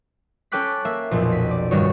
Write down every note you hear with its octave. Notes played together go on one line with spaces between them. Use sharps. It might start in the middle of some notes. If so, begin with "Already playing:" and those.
C#4 A4 G5 D6 F#6 B6
A#3 E5
B1 F2 A#2
B6
D5
D#1 G2 D#3 G3 F#4 C#5